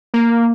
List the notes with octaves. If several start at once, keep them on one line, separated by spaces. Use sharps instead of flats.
A#3